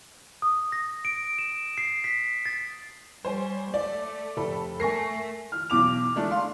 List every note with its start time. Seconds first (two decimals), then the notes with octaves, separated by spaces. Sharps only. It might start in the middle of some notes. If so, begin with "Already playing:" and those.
0.42 D#6
0.72 A#6
1.05 D7
1.38 E7
1.78 C7
2.04 B6
2.46 A6
3.25 G3 C5 C#5 G#5
3.74 A3 D5
4.37 F1 A4 B5
4.80 A3 A#4 G#5 C#6 A#6 C7
5.52 F6
5.70 B1 E2 D6 F7
6.16 G#3 A3 D4
6.31 F5 C6